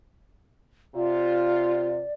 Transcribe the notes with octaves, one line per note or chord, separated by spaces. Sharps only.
C3 F4 D5